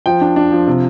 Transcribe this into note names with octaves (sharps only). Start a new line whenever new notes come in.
F3 G5
D4
D4
F3
C3